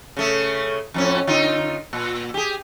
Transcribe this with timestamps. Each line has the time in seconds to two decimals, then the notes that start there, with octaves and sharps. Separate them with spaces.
0.17 C#3 A3
0.94 F2 A2 C#4
1.27 D3 D#4 F4
1.93 A#2
2.34 G4 G#4